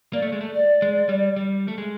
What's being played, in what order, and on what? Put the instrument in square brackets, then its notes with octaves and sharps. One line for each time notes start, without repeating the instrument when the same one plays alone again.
[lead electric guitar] A#3 [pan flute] D5
[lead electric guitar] A3
G#3
A3
[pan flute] D5
[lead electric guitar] G#3
G3
G3
A3
G#3